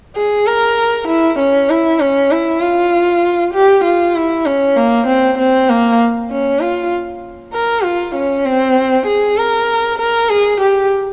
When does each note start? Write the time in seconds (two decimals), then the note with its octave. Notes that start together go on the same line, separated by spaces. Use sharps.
0.16 G#4
0.47 A#4
1.08 E4
1.39 C#4
1.70 E4
2.00 C#4
2.31 E4
2.61 F4
3.54 G4
3.84 F4
4.15 E4
4.46 C#4
4.77 A#3
5.07 C4
5.39 C4
5.69 A#3
6.30 C#4
6.61 F4
7.53 A#4
7.84 F4
8.15 C#4
8.45 C4
9.07 G#4
9.37 A#4
9.99 A#4
10.30 G#4
10.61 G4